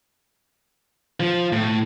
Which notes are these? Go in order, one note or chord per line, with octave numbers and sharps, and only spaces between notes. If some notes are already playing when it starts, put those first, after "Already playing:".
F3
A2